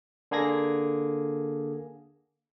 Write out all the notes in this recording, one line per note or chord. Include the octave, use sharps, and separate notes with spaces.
D3 A#3 G#4 G#6 A#6